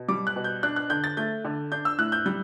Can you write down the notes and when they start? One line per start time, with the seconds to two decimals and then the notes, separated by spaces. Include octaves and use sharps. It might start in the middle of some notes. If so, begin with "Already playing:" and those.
Already playing: B2
0.08 G3 D6
0.27 F#6
0.36 B2
0.44 G6
0.63 D4 F#6
0.76 F#6
0.90 D3 G6
1.04 A6
1.17 A3 G6
1.45 D3
1.72 D4 G6
1.85 E6
1.98 A2 F#6
2.12 G6
2.26 G3 G6